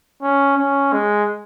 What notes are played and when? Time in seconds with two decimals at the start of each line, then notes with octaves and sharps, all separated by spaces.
0.23 C#4
0.58 C#4
0.93 G#3